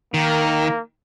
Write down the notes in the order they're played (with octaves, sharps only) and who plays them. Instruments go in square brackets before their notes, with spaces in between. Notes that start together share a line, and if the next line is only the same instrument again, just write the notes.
[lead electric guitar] D#3 [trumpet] A#3